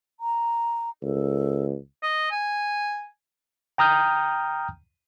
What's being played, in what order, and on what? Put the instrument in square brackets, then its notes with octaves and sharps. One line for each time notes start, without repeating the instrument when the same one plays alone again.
[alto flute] A#5
[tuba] C#2 [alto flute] A4
[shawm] D#5
G#5
[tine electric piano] G5 A#5 D#6 F6 G6